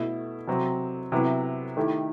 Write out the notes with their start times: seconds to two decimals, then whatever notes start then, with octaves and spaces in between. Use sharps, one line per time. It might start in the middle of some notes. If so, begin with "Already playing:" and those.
Already playing: B2 A3 E4
0.47 C3 F#3 C4
1.12 C3 F#3 B3 E4
1.77 D#3 A3 E4 G4